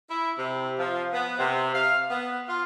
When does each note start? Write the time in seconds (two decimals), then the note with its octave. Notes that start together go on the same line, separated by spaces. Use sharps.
0.10 E4
0.38 C3
0.79 F3
1.13 B3
1.38 C3
1.74 F5
2.09 B3
2.47 F4